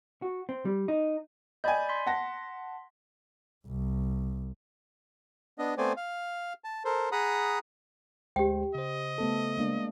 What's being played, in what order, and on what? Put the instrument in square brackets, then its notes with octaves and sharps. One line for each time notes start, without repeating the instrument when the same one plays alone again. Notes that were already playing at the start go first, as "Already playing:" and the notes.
[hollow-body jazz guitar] F#4
C4
G3
D#4
[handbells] D5 B5 G6 [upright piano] D#5 G#5
[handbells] C6 B6
[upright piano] F#5 A5 A#6
[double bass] C2
[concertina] B3 D4 D#5
A3 B3 C4 C5 D5 G#5
F5
A5
A4 A#4 C5
G#4 F#5 A#5 B5 D#6
[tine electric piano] D2 G#3 C5 [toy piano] G4 G5
[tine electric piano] C#3 C5 [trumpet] D#5
[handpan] A3 B3 A4
G#3 A#3 D4